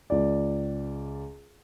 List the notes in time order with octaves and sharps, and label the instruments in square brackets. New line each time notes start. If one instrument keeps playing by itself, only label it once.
[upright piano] C#2 D5